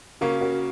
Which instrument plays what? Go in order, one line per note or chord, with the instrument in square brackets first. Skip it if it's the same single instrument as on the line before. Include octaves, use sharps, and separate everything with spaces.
[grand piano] C#3 A#3 C#4 [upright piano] F#4 A#4
[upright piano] F#4 A#4